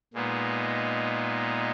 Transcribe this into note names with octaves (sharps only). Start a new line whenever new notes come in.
A#2 G#3 B3 D#4